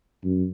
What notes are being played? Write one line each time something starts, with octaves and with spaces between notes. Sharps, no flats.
F#2